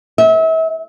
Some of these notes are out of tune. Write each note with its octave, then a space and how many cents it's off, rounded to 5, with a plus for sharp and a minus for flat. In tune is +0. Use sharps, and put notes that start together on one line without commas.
E5 -35